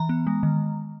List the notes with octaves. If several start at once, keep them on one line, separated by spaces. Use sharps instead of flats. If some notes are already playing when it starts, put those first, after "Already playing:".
Already playing: E3 A#5
B3
G#3
D#3